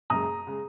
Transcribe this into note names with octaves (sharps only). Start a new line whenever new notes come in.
F#1 F#2 C#3 G#3 A#5 D#6
C#3 G#3